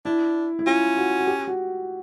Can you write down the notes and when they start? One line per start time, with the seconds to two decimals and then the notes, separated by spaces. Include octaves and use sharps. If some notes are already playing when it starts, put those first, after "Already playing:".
0.05 D4 E4
0.59 E4
0.66 C#4 F4
0.97 F#4
1.19 F#4
1.27 G4
1.48 F#4